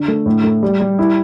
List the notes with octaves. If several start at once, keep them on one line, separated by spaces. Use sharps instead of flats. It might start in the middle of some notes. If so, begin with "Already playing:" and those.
Already playing: D3
A3
A2
A3
G3
G3
E4